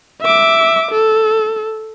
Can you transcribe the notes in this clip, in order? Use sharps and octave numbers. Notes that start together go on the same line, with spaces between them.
E5 D6
A4